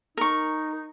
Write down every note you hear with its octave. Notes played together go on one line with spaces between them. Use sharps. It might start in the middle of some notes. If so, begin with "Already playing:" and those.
D#4 A#4 C#6